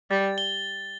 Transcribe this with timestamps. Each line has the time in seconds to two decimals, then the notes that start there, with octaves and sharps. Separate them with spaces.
0.11 G3 A6
0.38 G7